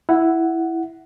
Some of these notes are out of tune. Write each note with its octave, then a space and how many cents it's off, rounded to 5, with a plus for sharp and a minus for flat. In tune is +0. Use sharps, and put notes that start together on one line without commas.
E4 +0 F#5 +0